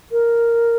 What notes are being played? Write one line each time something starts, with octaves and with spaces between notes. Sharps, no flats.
A#4